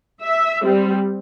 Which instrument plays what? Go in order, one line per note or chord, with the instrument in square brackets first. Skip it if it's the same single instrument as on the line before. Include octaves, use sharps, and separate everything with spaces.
[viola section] E5
G3 C4